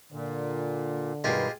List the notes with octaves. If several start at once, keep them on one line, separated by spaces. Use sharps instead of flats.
A#2 D3
G2 B2 D#3 G#3 F4 G4